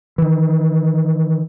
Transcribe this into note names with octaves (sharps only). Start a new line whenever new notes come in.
D#3 E3